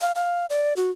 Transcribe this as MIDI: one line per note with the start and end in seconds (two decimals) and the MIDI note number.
0.01 0.12 77
0.15 0.46 77
0.50 0.73 74
0.77 0.91 66